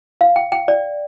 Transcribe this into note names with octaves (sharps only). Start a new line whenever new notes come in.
F5
G5
G5
D5